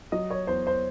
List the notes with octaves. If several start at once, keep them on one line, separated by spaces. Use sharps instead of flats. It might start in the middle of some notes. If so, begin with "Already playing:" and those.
F#3 D#5
C#5
E2 C5
C5